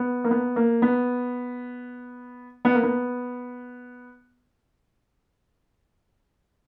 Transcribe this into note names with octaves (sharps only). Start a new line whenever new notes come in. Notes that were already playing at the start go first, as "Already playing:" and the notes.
Already playing: B3
A#3
B3
A#3
B3
B3
A#3
B3